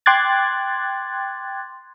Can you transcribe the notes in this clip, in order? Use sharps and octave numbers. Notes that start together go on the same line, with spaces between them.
G5 C6 D6 F#6 G#6 A6